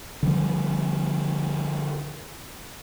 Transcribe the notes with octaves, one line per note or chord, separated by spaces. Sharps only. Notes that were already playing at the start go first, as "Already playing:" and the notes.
D3 F3 G3